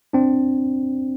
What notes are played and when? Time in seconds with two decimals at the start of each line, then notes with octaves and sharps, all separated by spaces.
0.13 C4 D4